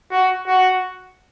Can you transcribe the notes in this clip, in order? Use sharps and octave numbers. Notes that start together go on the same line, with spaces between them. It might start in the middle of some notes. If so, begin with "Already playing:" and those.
F#4
F#4